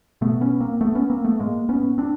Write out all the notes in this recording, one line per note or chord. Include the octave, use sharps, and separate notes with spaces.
B2 A3 B3
B3 C#4
A#3 C4
A3 B3
B3 C#4
A#3 C4
A3 B3
A2 G#3 A#3
B3 C#4
C4 D4